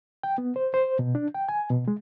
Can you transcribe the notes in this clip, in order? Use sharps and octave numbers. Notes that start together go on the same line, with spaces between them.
G5
B3
C5
C5
B2
D4
G5
G#5
B2
G#3